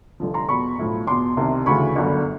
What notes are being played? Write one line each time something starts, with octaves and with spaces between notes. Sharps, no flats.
F1 F2 D3 F3
A#5 C6
E2 B2 B5 C#6
B1 A2 F3
E2 B2 C6 D6
C2 C3 D#3
D2 C#3 E3 B5 C#6
G1 F#2 D3